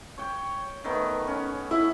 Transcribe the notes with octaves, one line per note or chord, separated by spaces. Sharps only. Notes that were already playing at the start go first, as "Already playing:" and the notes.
C#5 G5
D#3 A3 B3
C#4
E4